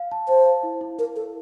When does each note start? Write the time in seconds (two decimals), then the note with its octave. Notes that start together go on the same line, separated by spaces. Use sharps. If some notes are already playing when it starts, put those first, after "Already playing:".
Already playing: F5
0.11 A5
0.28 C5 A5
0.46 F5
0.63 E4
0.81 E4
0.98 E4 A#4
1.16 E4 A4